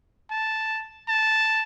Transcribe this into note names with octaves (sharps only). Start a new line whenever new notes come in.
A5
A5